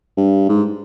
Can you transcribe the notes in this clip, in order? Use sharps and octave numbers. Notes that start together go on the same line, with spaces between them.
G2
G#2